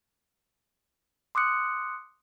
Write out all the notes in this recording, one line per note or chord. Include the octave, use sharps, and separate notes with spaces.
C6 D6 D#6 F#6 C#7